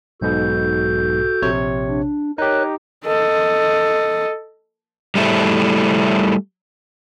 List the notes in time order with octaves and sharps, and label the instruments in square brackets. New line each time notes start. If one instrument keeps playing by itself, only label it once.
[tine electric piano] B1 G#2 B2 [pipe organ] F#4 A4 G6
[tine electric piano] A#1 C3 C#5
[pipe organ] D4
[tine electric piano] D#4 G4 [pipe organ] A#4 C#5 F#6
[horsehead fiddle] A4 D#5
[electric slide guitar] G3 A3 E4